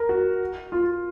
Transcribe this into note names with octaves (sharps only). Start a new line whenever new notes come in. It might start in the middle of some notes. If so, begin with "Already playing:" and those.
Already playing: A#4
F#4
F4